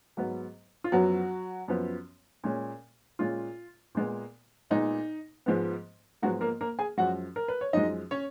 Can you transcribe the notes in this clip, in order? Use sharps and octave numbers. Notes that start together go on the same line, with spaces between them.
G#2 F#3 B3
F4
F#2 F3 F#3 B3 F#4
F#2 F3 B3
A#2 G#3 C#4
A#2 G#3 C#4 F4
A#2 G#3 B3
A#2 G#3 B3 D#4
G#2 F3 G#3 B3
G#2 F3 F#3 G#3 B3 F#4
A#3 A#4
A#3 A#4
G#4 G#5
F#2 F3 G#3 F#4 F#5
A#4
B4
C#5
F#2 F3 G#3 D#4 D#5
C#4 C#5